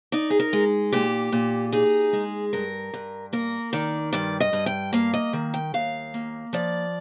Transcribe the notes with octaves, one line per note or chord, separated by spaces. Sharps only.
D#4 D5
G#4
A#4
G#3
A#2 G4
A#2
D#4 G#4
G#3
G2 A#4
G2
A#3 A#4
D#3 D5
G2 D5
D#5
G2
G5
A#3 F5
D#5
D#3
G5
D#2 F5
A#3
F3 D5